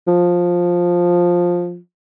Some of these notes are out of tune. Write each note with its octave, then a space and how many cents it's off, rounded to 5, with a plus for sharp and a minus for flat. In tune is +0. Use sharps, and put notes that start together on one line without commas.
F3 +10